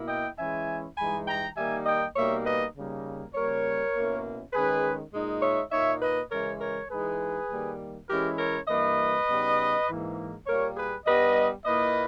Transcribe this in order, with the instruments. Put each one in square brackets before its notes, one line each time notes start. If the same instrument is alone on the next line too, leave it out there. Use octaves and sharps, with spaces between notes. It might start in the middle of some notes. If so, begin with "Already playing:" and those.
Already playing: [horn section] B2 A#3 E4
D#5 G5
E3 G#3 C#4 E4 E5 G#5
G2 E3 G#3 D#4 G#5 B5
G5 A#5
D#3 G3 A#3 D#4 E5 G#5
D#5 G5
B2 G3 A#3 D#4 C#5 E5
B4 D#5
C#3 G3 A#3 D#4
C#3 G3 A#3 A#4 C#5
B2 A#3 C#4 E4
D#3 G#3 C#4 G#4 B4
A#2 G#3 D#4
C#5 E5
A#2 A#3 D#4 C#5 E5
B4 D#5
C#3 E3 G#3 C#4 A#4 C#5
A#4 C#5
E3 G#3 D#4 G#4 B4
D#3 G3 A#3
E3 G#3 C#4 E4 G4 A#4
A#4 C#5
G2 E3 A#3 B4 D#5
C#3 G3 B3 D#4
G#2 E3 A#3
A#2 G3 A#3 A#4 C#5
G#4 B4
G2 G3 B3 B4 D#5
A#2 A#3 E4 B4 D#5